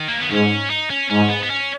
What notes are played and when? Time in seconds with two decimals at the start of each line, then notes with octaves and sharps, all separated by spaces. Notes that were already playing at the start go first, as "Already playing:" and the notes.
Already playing: D#3
0.08 A#3
0.19 B3
0.30 G#2 C#4
0.70 D#4
0.90 C#4
1.10 G#2 C#4
1.30 B3
1.43 B3
1.50 C#4